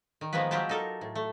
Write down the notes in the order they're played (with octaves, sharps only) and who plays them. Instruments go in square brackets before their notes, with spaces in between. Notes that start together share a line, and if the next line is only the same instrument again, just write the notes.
[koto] D#3
D#3 F3 G#3 A#3 B3 B4
F#3 G#3 F4 G4 G5 A5
D#4 A4 A#4
A2
A3